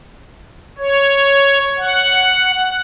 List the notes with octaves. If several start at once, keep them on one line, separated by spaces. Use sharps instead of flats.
C#5
F#5